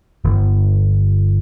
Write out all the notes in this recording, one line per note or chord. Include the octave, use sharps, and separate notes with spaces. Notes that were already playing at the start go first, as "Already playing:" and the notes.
G1